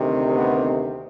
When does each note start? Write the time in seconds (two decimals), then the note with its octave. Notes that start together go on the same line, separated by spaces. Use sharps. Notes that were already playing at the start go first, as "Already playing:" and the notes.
Already playing: D2 C3 D#3
0.36 A3 B3